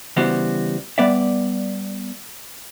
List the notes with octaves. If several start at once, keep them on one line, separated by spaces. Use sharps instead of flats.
C#3 E3 G3 B3 F#4 C5
G3 B3 D5 E5